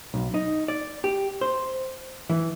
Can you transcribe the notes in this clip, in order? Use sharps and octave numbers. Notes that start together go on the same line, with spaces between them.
B1
D#4
D5
G4
C5
E3